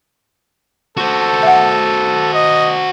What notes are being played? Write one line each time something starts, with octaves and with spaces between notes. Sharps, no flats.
F#4 A4 C5
E5 F#5
D#5